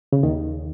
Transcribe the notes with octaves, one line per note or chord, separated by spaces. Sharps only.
C#3
D#2 D#3